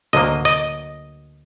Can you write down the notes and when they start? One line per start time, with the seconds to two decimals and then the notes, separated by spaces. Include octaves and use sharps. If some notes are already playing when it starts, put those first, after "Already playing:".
0.13 D2 D3 F#3 A#3 D#5
0.45 D#5